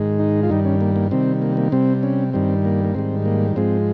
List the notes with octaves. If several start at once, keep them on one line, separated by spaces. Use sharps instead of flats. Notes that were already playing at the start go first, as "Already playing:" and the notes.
Already playing: G#2 D#3 G#3
D#4
F4
G2 D#3 G3 D#4
C#4
A#3
A#3
C3 D#3 G3 C4
A#3
A#3
C3 G3 C4
C#4
G2 D#3 G3 C4
A#3
A#3
G#2 D#3 G3 C4
A#3
G#2 F3 G#3 C4